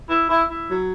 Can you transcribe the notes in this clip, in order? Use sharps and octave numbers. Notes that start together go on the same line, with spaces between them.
E4
E4
E4
F#3